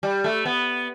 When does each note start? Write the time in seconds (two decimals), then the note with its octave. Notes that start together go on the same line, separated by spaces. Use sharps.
0.03 G3
0.24 A3
0.46 B3